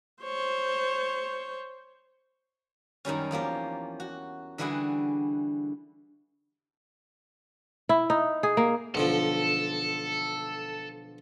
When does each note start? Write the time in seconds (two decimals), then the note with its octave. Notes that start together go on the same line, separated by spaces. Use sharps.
0.23 C5 C#5
3.05 F#2 D#3 G3 C#4
3.31 E2 F3 A#3 G4
4.00 F#4
4.58 D3 E3 G3 E4 F#4 G#4
7.89 E4
8.10 D#4
8.43 G#4
8.57 A#3
8.95 B1 D3 F3 A4